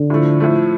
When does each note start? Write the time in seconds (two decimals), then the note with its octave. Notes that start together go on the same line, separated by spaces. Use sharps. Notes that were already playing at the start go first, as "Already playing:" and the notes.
Already playing: D3
0.10 A2 F3 A3
0.40 A2 F3 A3